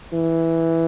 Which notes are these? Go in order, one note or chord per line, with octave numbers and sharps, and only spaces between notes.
E3